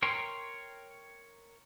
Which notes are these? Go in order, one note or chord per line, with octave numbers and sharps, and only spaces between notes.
A#4 C#5 G5 A#5 C6